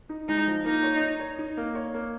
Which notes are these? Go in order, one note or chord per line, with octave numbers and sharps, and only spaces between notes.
D#4
G#3 D#4
F3
A#3 D#4
C#5
D#4
C#5
D#4
A#3
C#5
A#3